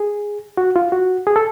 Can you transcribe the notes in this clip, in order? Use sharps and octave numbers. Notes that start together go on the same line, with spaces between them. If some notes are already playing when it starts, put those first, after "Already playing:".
Already playing: G#4
F#4
F4
F#4
G#4
A4